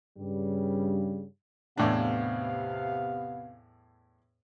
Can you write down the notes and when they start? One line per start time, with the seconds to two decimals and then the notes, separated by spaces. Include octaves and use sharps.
0.18 G2 C#3 G3
1.77 E2 A2 C3 B3 D4 F5